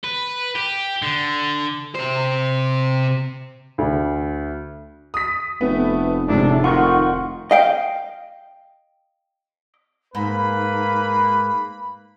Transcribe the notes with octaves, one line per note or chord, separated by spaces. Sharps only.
B4
G4
D3
C3 C5
D2
D#6 B6
F1 A3 B3
A2 C3 G#3 D4
D#3 F4 F#5 C#6
D#5 F5 G5
G#2 A#3 B4 B5